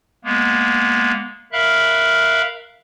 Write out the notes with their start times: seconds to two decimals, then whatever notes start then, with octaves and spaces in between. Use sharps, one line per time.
0.24 G#3 A#3 B3
1.52 A#4 E5 F5 B5 F#6